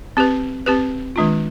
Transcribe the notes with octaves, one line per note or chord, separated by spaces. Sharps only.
C4 G4 B4
C4 G4 B4
D#3 G#3 D4 F4